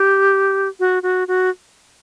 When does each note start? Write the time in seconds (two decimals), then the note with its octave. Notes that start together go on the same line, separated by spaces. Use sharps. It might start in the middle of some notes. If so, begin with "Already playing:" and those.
Already playing: G4
0.80 F#4
1.03 F#4
1.28 F#4